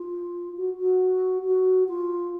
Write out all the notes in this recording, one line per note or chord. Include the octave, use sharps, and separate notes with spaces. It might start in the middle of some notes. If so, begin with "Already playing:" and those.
Already playing: F4
F#4
F#4
F#4
F4